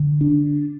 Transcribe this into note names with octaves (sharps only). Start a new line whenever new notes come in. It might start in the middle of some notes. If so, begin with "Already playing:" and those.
Already playing: D3
D4